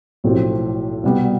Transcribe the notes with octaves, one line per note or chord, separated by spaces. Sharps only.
B1 A2 F3 C4 G4
C2 B2 G3 B3